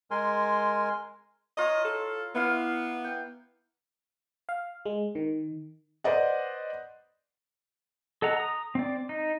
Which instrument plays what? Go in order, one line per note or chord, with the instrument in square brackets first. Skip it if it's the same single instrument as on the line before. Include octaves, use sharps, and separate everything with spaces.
[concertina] G#3 A#4 G#5 C6
[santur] F4 C#5 A#5 [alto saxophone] D#5
[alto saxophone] A4
[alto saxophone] B3 [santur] E4 F5 D6
[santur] G5
[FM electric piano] F5
G#3
D#3
[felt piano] B4 C5 D5 D#5 F#5
[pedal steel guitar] A4 D#5 F#5 A#5
A#5 D#6
C4 D5
D#4